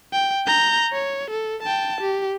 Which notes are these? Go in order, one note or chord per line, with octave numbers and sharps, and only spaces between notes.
G5
A#5 G6
C#5
A4
G5 A5
G4